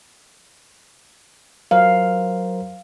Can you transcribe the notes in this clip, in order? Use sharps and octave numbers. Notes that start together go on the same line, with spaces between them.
F#3 A#4 C5 F5